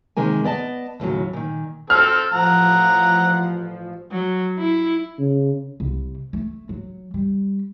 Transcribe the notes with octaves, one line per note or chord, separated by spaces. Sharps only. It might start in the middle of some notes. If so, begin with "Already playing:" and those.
C3 D#3 G#3 A#3 G#5
B3 D5 D#5 A5
D#2 A2 C#3 F#3
A#2 D#3
C4 A4 F6
A1 F3 F#5 A#5
F#3
E4
C#3
C2
A3
F#3
G3